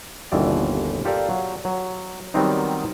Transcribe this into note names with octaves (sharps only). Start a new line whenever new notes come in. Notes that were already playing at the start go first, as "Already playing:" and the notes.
G1 D#2 B2 E3 C4 D5
F4 G4 A4 A#4 D5 F5
F#3
F#3
D#3 F#3 G3 B3 C4 D#4